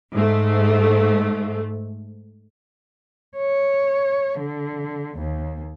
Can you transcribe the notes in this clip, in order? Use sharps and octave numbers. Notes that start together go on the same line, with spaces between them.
G#2 A3
C#5
D3
D#2